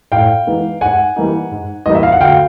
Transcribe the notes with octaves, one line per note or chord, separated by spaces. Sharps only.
A2 F5 G5
E3 G#3 B3 D#4
G#2 F#5 G#5
E3 G3 A#3 D#4
G#2
E3 G3 A#3 D#4 D#5
E5
F5
F#5
D2 F5 G5